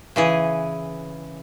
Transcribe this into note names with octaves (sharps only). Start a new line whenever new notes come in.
C#3 E3 G#4